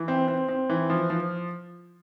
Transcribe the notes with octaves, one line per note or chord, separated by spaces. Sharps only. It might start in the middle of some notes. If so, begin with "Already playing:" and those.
Already playing: E3
C4
C4
C4
E3
F3
F3